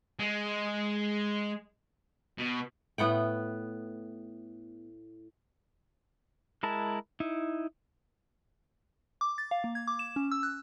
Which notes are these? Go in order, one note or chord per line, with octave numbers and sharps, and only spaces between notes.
G#3
B2
A2 B3 F#5 G5
G#3 E4 A#4 A5
D#4 E4
D6
A6
F5
A#3
G#6
D6
E7
C#4
E6
F#6